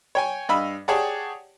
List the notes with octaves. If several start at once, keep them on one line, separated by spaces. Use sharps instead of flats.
C#5 G5 G#5
G2 D#5 F5 B5 E6
G4 G#4 C#5 D5 F#5 A5